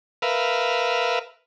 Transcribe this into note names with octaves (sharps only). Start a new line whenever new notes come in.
A#4 B4 E5 F5